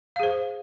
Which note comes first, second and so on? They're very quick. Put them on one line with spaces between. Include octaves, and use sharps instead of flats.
F5 G#4 C5